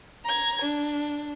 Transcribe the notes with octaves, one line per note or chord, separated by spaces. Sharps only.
A#5 G#6
D4